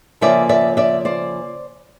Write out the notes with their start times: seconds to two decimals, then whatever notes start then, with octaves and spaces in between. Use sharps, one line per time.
0.21 C#3 F3 A#3 C#4 D5 E5
0.49 D5 E5
0.77 D5 E5
1.05 C5 D5